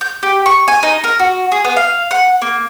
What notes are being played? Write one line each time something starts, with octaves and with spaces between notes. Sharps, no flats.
G6
G4
C#6
G#5
D#4
A#4
F#4
G#4
B3
F5
F#5
A#3